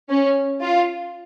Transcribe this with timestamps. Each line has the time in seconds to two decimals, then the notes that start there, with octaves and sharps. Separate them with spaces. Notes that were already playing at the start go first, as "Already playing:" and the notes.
0.09 C#4
0.62 F4